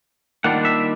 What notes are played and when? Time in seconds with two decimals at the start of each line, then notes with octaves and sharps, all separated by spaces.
0.44 D#3 G3 A#3 D4 F4 F#5
0.65 E5